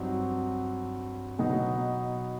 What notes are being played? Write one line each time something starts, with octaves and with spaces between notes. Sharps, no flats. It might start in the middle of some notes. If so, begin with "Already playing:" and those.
Already playing: G2 F#3 C4 D#4
B2 F#3 B3 D#4